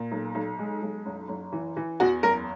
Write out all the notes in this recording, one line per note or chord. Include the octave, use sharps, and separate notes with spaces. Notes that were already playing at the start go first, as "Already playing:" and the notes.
Already playing: A#2
B1
B1
G#3
B1
F#1
F#1
E3
E3
E2 F#4
F#1 A#4